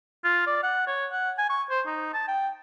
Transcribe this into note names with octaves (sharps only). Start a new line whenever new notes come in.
F4
D5
F#5
C#5
F#5
G#5
C#6
C5
D#4
A5
G5